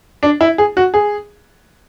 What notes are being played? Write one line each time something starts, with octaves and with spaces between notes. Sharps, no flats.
D4
E4
G#4
F#4
G#4